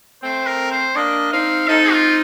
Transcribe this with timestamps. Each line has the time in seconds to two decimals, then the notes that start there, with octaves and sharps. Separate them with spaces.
0.23 A3 C4 C5
0.46 A#4
0.71 C5
0.95 A#3 D4 D#5
1.31 C4 D#4 F5
1.68 C4 D#4 A4
1.92 F4